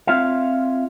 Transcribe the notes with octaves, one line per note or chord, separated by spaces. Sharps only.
C4 F4 C#5 E5 F5